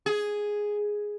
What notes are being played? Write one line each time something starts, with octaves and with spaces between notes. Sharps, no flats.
G#4